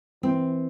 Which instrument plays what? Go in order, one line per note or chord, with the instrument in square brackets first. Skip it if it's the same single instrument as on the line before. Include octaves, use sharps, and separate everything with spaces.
[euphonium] E3 [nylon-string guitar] C4